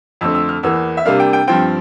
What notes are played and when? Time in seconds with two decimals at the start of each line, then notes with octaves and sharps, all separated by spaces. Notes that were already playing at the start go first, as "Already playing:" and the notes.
0.21 F2 D3 A3 C4 E6
0.35 E6
0.49 F6
0.63 E2 E3 A#3 E6
0.97 E5
1.05 C3 G3 A#3 D4 F5
1.20 G5
1.33 G5
1.47 G2 F3 C4 G5